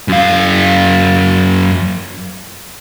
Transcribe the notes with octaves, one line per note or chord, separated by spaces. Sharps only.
F#2 F5